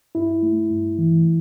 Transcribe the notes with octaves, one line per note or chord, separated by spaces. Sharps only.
G2 E4
A3
G2
E3